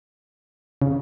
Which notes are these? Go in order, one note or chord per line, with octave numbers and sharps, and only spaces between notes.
C#3